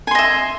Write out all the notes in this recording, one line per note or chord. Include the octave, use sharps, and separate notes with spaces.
D#5 E5 G#5 C6